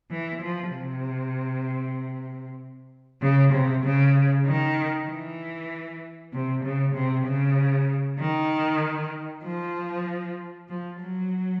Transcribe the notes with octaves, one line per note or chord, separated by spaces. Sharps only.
E3
F3
C3
C#3
C3
C#3
D#3
E3
C3
C#3
C3
C#3
D#3
F3
F3
F#3